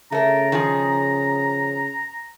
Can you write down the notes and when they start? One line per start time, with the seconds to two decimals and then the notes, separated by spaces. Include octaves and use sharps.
0.12 C#3 A3 A#4 A#5
0.52 D#3 F3 G#4